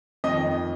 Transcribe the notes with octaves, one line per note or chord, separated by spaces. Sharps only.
F2 D#3 D#5